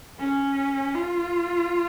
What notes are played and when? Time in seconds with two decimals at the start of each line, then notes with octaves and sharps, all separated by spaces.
0.19 C#4
0.95 F4